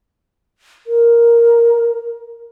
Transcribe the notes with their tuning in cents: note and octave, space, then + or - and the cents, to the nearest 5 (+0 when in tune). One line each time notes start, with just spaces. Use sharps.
A#4 +5